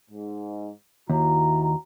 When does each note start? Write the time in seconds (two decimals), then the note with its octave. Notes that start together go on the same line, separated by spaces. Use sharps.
0.10 G#2
1.10 D#2 E4 F#4 A#5